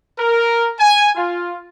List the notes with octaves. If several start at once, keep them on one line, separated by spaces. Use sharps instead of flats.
A#4
G#5
F4